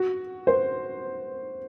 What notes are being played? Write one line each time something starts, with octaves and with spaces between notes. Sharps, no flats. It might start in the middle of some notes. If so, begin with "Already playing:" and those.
Already playing: F#4
C5